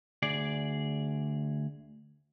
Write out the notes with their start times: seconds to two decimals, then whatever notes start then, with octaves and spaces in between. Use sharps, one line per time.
0.22 D2 G#4 D5